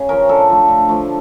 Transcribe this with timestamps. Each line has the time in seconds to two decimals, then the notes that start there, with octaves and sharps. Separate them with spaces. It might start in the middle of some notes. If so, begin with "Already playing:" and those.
Already playing: C#3
0.09 F3 C#4 A#4
0.29 D3 A4
0.50 F3 A3
0.68 D3
0.89 F3 A3